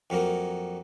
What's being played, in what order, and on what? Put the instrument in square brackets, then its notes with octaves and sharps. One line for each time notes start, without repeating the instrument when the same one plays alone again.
[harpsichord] F2 F#3 A#3 A#4